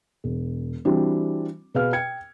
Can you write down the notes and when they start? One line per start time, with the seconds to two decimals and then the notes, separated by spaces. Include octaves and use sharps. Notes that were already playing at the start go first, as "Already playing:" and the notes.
0.24 E1
0.85 E3 G3 C4 D4 F#4
1.74 B2 G#4 B4 F5 F6
1.93 G5 G#6 C#7